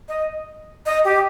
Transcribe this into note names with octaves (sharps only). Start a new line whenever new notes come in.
D#5
D#5
G4